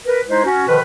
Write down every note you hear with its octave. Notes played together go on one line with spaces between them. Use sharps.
A#4 B4
G#3 D#4 E4 C5
C#4 F#4
B2 D3 D#3 F3 B4